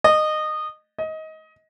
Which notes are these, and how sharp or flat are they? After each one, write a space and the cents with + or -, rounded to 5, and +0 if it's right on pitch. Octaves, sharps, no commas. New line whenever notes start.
D#5 -20
D#5 +20